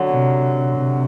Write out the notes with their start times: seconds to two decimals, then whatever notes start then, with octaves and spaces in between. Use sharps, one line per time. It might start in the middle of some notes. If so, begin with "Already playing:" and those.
Already playing: D3 F#3
0.10 C3
0.76 C3